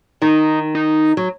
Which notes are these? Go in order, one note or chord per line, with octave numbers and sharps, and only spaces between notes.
D#3 D#4
D#4
F#3